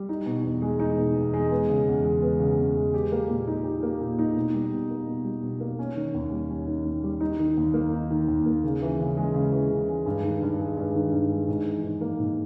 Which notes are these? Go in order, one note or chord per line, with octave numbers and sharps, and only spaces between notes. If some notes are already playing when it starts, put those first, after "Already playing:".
Already playing: G3
D#4
B2
E2
G#3
D#4
B2
E2
G#3
B3
C#3
E2
G#3
B3
C#3
E2
G#3
G4
A#3
A#2
D#4
G4
A#3
A#2
D#4
B2
G3
B2
A#3
B2
G3
B2
A#3
C#4
D#3
D#2
G3
C#4
D#3
D#2
G3
D#4
D#3
D#2
A#3
D#4
D#3
D#2
A#3
C#3
E3
C#3
G#3
C#3
E3
C#3
G#3
G2
D#3
G2
G#3
G2
D#3
G2
G#3
G#2
E3
G#2
A#3
G#2